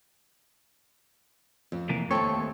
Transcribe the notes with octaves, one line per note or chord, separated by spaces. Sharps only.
F2
C3 E3 A#3
D#2 A3 C4 A4 C#5